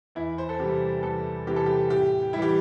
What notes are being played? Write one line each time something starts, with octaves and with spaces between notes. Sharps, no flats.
E2 E4
C5
A4
C3 E3 G3 G4
E2 A4
C3 E3 G3 G4
A4
G4
A2 G4
G3 E4
E3 G4